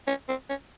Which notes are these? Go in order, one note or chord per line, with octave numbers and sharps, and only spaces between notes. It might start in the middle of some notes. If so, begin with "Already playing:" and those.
C#4
C4
C#4